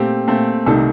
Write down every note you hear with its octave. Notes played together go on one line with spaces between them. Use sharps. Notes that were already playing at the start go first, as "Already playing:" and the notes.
Already playing: A#2 A3 C4 G4
A#2 A3 C4
C2 C3 D#3 A3 A4